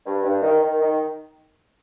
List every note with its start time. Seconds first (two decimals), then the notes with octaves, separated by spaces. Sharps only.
0.05 G2
0.23 G2
0.42 D#3
0.61 D#3
0.80 D#3